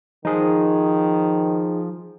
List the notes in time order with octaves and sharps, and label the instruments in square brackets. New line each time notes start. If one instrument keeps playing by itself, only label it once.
[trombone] D#3 [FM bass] F3 [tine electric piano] D#4 G#4